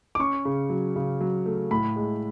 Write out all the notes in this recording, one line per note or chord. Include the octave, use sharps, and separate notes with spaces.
D6
C#4 C#6
C#3
F#3
C#3
F#3
A3
A2 B5
G#3